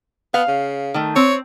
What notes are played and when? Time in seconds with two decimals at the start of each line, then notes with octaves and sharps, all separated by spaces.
0.34 B3 F5
0.48 C#3
0.94 D#3 A3
1.16 C4 C#5